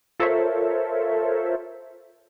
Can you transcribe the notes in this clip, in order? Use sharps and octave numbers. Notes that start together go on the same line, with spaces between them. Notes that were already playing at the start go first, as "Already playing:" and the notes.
F4 A4 A#4 C5 C#5 E5